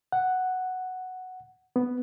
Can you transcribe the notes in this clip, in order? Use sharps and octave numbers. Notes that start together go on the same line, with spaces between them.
F#5
B3